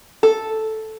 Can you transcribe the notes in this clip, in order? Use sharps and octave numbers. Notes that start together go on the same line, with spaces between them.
A4